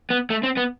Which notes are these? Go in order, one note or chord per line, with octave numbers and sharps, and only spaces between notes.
B3
A3
C4
B3